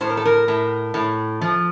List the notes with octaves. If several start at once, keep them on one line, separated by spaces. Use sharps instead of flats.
A2 C5
A#4
A4
A#4
A2
A2
F3